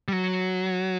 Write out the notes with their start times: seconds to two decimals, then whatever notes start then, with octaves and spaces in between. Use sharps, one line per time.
0.08 G3
0.13 F#3